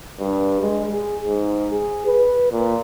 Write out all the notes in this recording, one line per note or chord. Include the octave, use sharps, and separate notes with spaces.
G2
G#3
G#4
G#2
G#4
B4
A#2